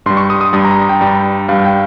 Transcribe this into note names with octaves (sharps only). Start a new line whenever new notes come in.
G2 G3 C6
C#6
D#6
D#6
G2 G3 D#6
A#5
G5
G2 G3
G2 G3 F5
G5